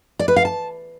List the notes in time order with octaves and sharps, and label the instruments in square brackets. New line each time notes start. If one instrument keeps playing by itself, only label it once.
[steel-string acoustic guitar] D5
B4
F5
A5